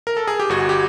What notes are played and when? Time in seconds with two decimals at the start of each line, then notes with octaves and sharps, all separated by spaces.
0.07 A#4
0.17 A4
0.27 G#4
0.40 G4
0.49 G1 F#4
0.69 G4